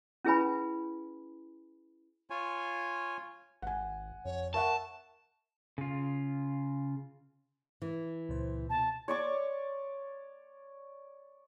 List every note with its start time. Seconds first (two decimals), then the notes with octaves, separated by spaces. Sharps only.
0.25 C#4 E4 G#4 B4 G#5 B5
2.30 F4 C#5 G#5
3.62 G#1 F#5 G#5
4.25 F2 C#5
4.54 A#4 E5 F#5 A5 C#6
5.78 C#3 F4
7.82 E3
8.29 C#2 A#2 C5
8.70 B2 A5
9.08 C#5 D5 C#6 D6